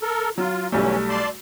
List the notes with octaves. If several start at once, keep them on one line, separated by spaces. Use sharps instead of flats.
A4 A#4
F#3 F4
B1 E2 G3 A3 C#4
D5 A5 C6